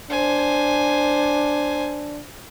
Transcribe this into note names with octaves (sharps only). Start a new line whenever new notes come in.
D4 C5 G#5